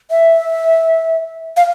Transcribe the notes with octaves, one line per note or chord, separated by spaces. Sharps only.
E5
F5